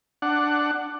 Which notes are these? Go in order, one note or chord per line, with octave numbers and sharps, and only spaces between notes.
D4 F#5